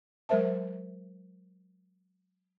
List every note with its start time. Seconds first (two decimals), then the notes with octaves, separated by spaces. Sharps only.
0.29 F#3 G#3 A#4 C5 E5 A5